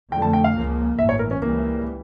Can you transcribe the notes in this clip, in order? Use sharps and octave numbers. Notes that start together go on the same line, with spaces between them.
F2 D3 F3 A3 G5
A5
G5
F5
C#2 C#3 F3 A#3
A1 G2 E3 E5
C#5
A#4
C#4
C#2 C#3 E3 G3 A#3